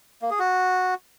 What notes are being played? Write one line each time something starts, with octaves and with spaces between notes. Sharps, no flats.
A#3
G#4
F#4